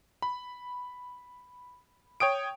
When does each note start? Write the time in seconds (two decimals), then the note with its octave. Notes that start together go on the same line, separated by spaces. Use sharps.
0.22 B5
2.20 C#5 G5 D#6 D7